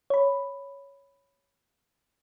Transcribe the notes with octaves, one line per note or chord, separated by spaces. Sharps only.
C#5 B5